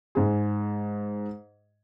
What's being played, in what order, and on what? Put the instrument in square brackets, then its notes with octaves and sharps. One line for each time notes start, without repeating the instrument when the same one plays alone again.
[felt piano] G#2 G#4